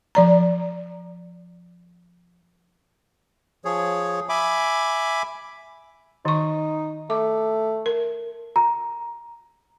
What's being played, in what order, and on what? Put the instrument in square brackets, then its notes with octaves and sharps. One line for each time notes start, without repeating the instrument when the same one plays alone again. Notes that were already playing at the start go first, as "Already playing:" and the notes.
[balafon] F3 D5 A#5
[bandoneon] F3 G#4 C#5
E5 G#5 B5 D6
[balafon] D#3 C#6 [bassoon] D#4
[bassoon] A3 [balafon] D6
[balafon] A#4
[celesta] A#5